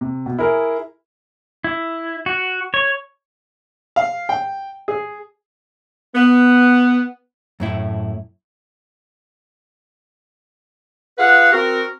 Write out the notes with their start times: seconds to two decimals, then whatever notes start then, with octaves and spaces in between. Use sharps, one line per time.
0.01 C3
0.26 B2
0.39 E4 G#4 A#4
1.64 E4
2.26 F#4
2.74 C#5
3.96 F5
4.29 G5
4.88 G#4
6.15 B3
7.60 F#2 A2 E4
11.18 F4 G#4 B4 F5 F#5
11.52 C4 F#4 A#4